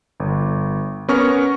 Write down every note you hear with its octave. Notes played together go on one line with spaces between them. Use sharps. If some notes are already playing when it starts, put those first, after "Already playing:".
G1
B3 C#4 A#4 C#6 F6